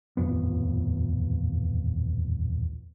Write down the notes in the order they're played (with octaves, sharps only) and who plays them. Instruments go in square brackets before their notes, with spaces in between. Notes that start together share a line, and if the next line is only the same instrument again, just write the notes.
[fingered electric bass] D#1 A1 F2 B3